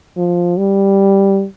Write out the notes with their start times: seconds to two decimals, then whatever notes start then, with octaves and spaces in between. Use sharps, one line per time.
0.17 F3
0.58 G3